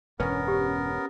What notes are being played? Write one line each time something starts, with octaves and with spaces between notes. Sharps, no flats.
E1 G2 B3 C#4 A#4 B4
G4